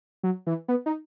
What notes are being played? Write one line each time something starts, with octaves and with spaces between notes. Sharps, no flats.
F#3
E3
B3
D#4